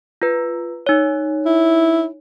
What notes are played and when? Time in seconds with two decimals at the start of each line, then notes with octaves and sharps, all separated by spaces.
0.22 F4 B4
0.87 D#4 C#5
1.46 E4